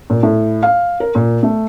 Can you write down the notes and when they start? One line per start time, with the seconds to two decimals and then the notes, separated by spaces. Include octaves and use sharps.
0.10 A#2
0.23 A2
0.63 F5
1.00 A#4
1.15 A#2
1.43 A3